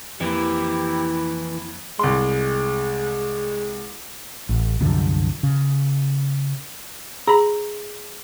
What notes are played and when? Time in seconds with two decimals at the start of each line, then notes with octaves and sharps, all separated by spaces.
0.20 F2 E3 A#3 E4 G4
1.99 C2 G#3 C6
4.49 A1
4.80 C2 F#2 D3 F3
5.43 C#3
7.27 G#4 A#5 B5